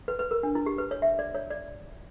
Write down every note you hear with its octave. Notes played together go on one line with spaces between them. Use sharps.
B4
B4
A#4
D4
E4
G4
B4
C#5
E5
D5
C#5
D5